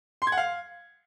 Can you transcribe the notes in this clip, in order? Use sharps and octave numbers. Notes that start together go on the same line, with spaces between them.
C6
G#6
F#5
F5